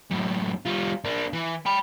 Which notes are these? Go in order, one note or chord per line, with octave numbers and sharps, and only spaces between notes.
F#2 A2
G3 F4
A#3 D4
E3
G5 B5